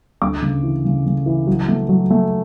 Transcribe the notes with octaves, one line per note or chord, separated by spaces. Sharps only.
D2 D6
C#3
E3
C#3
C#3
E3
F#3
A3
F#3
A3